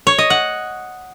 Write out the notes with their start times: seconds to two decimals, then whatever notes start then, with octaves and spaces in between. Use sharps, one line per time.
0.07 C#5
0.18 D#5
0.30 F#5